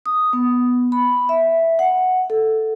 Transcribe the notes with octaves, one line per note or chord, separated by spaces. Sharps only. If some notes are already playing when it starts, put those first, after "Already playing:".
D#6
B3
B5
E5
F#5
A4